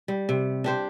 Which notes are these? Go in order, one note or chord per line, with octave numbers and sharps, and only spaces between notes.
G3
C3
D4 G4 C5